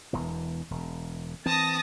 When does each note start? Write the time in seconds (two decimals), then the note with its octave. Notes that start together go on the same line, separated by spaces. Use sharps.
0.13 E1 E2 E3
0.71 E1
1.46 E3 C4 A5 D#6 A#6